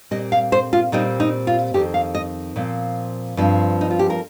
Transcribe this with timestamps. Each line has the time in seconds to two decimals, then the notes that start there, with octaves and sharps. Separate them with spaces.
0.11 A#2 G3 C4 D#5
0.32 F5
0.52 C5
0.73 F4
0.92 A#2 G3 C4 D#4
1.20 D#4
1.47 F4
1.74 F2 D#3 C4 G4
1.94 F5
2.15 D#5
2.56 A#2 F3 C4
3.37 G2 F3 C4
3.81 D#4
3.90 F4
3.99 G4
4.10 A#4